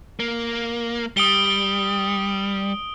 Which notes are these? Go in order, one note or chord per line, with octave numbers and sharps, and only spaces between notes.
A#3
G3 D#6 D7 G7